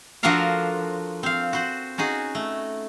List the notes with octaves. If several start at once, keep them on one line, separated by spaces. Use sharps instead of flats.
F3 D4 F#4 A4 A#4 F5
C4 F5
F#4 C5 F#5
C#4 D#4 F#4 G#4
A3